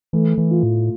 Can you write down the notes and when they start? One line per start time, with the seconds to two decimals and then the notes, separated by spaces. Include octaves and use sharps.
0.13 E3 A3
0.38 E3
0.51 F4
0.63 A2